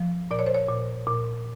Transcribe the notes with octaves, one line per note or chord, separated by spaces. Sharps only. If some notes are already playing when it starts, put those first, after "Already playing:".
Already playing: F3
A#2 D5
C#5
C5
C#5
A#2
A#2